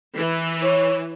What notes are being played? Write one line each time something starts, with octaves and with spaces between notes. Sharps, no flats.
E3
C#5